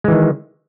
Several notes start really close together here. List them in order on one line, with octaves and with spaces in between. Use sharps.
G#3 E3 D#3